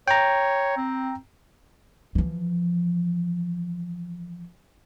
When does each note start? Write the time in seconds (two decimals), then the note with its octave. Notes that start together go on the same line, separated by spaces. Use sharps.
0.08 C#5 G5 A#5
0.77 C4
2.15 E3 F3